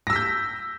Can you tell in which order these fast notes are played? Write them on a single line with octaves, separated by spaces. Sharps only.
A#6 E6 B6 G6